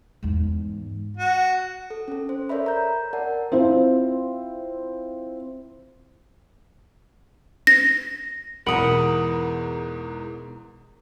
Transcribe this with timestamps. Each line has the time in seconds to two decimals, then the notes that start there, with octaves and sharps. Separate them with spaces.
0.23 E2 G#2
1.17 F#4
1.90 A4
2.08 C#4 A4
2.29 C5
2.49 A4 A#4 C#5 D5 E5 B5
2.66 A#5 G6
3.13 A#4 D5 F#5 A5
3.52 C4 E4 F4 C5
7.67 A#6
8.67 E2 G#2 B2 A#4 F#5 B5 D#6 D7